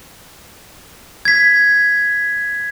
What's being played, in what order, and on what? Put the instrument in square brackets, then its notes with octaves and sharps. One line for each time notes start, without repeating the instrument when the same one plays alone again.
[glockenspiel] G#6 B6